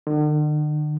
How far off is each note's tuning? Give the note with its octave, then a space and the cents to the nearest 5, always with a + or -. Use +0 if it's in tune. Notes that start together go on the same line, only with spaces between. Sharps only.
D3 +45